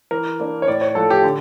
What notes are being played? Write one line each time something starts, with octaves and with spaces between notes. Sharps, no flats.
E3 A#4
A#3 D4
C#5
A2 D5
C#5
F3 A3 A4
G4
D3